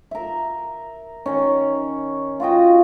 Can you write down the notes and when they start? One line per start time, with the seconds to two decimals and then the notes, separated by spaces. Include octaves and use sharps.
0.11 A#4 E5
1.26 D#3 C#4
2.40 F4 F#4 D#5 G5